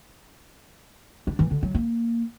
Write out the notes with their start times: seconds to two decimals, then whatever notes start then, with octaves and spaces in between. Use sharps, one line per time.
1.27 D4
1.39 E3
1.51 D3
1.63 F#3
1.74 A#3